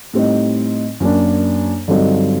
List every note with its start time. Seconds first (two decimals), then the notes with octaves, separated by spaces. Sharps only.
0.14 A2 G3 C4 D#4
1.00 F#2 F#3 A#3 D4
1.88 G2 D3 F#3 C4 D#4